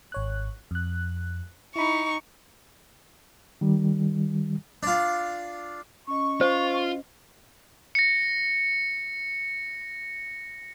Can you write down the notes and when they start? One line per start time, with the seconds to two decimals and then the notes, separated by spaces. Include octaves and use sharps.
0.12 G#1 C#5 F#6
0.71 F2 F#6
1.76 D#4 E4 B5 C#6
3.61 D#3 G3
4.83 D4 F4
6.08 C#4 D#5 C#6
6.41 F4 C5
7.95 A#6 C#7